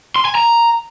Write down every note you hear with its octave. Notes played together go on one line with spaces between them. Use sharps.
C6
G#5
A#5